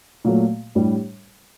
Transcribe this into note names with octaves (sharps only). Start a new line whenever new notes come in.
A#2 F#3 A3
A2 G3 D4